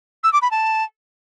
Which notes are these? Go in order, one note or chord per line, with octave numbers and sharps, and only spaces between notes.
E6
D6
B5
A5